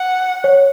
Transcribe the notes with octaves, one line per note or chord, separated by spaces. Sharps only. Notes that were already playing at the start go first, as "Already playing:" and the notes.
Already playing: F#5
C#5